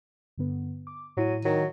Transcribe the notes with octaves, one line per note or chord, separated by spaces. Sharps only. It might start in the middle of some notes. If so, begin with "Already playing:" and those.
G2 D3 B3
D6
A2 F#3 E4 D#7
D#3 F#3